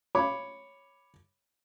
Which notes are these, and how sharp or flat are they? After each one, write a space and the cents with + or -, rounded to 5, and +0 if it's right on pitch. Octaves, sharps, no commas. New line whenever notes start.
C#5 +0 B5 +0 D6 +0